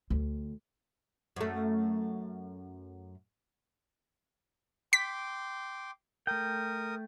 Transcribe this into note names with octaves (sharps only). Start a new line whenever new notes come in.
D2
F#2 A3
G5 C6 D6 B6
A3 A#4 G5 D#6